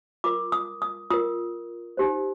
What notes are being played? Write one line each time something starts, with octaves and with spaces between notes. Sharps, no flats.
F4 A#4 D6
D#6
D#6
F4 A#4 D#6
D#4 G4 C5